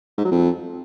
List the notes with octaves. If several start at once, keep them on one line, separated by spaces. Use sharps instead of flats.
G#2
F#3
F2